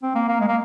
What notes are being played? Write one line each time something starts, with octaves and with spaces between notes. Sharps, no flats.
C4
A#3
A#3
G#3
A#3